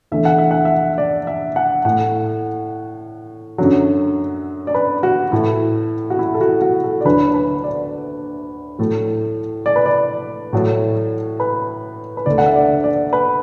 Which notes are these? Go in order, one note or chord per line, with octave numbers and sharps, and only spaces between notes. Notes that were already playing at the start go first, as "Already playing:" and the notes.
E2 D3 A3 E5
F#5
E5
F#5
E5
D5
E5
F#5
A2 A3 F#5
F#2 D3 F#3
D5
B4
F#4
A2 A3 E4
F#4
E4
A4
F#4
F#4
A4
D5
D2 D3 F#3 B4
B4
D5
A2 F#3 A3
D5
B4
D5
A2 F#3 A3
B4
B4
D2 D3 A3 D5
F#5
E5
D5
D5
B4